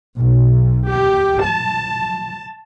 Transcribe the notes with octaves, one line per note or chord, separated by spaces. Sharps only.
B1
G4
A5